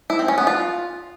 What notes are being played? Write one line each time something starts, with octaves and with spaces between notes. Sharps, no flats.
E4
C4
C#4
B3
F4